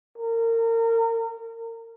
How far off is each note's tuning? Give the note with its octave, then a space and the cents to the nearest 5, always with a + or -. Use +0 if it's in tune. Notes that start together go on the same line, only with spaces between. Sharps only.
A#4 -30